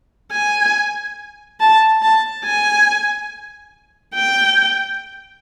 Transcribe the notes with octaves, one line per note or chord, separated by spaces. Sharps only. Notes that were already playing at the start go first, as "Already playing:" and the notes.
G#5
A5
A5
G#5
G5